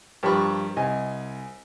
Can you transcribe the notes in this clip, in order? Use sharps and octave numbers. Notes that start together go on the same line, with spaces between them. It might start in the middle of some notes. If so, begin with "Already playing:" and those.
G2 F3 G3 A#4 B5 C#6
C2 D#5 G#5